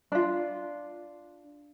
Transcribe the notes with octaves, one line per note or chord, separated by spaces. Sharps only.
D4 F4